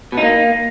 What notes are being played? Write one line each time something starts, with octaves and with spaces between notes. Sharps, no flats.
B2
D#4
A#3